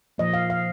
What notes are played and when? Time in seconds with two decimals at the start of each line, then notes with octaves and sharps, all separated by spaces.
0.18 A#2 F3 A#3 D#5
0.34 F5
0.50 F5